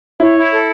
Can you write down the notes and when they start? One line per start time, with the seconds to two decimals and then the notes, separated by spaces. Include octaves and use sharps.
0.20 E4 C#5
0.36 E4
0.52 A4